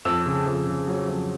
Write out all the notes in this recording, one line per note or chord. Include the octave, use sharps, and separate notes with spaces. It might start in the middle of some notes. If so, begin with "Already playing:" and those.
F2 E6
C#3
F2
C#3
F#3
F2